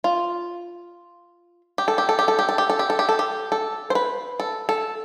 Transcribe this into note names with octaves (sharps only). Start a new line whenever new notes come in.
F4
G4
A4
G4
A4
G4
A4
G4
A4
G4
A4
G4
A4
G4
A4
G4
A4
C5
B4
A4
A4